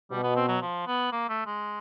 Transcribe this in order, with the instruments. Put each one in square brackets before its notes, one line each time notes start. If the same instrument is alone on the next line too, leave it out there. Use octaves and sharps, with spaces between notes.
[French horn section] B2 [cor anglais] G3
[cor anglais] B3
C4
F#3
F3
B3
A#3
A3
G#3